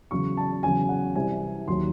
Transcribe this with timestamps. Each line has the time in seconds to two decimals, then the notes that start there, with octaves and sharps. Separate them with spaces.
0.11 E2 C#3 F#3 C#6
0.37 A5
0.63 E2 C#3 F#3 G#5
0.89 F#5
1.15 C2 C3 E3 G#5
1.68 D#2 D#3 F#3 C6